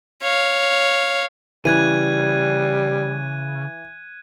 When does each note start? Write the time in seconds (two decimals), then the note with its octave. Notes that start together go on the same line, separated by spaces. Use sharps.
0.22 C#5 F5
1.65 C#3 E3 G3 F#6 G#6 D#7